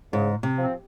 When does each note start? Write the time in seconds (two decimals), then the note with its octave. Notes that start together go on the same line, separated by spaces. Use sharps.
0.13 G#2 C#3
0.43 C3
0.58 F3 C4